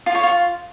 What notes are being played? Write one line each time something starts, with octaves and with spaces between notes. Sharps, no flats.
F4
C#5
F4